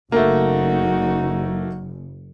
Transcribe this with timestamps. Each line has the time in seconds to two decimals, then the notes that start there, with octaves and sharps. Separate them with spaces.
0.12 F#1 A3 A#3 D#4 F#4